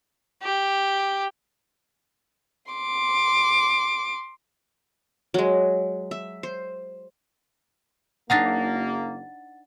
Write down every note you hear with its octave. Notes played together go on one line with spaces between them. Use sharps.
G4
C6 D6
F#3 G#3
E5
C5
F#1 A#3 D4 D#4 F5 F#5 A6